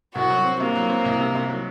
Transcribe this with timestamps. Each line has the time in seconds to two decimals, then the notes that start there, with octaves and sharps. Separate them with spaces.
0.15 C2 F#4
0.30 F#3
0.44 C4
0.60 C3 A#3
0.75 F#3
0.90 C4
1.05 C2
1.20 C3
1.35 C3
1.49 F#3